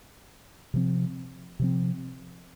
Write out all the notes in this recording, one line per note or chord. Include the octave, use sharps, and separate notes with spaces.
C3 F3 C4
C3 F3 C4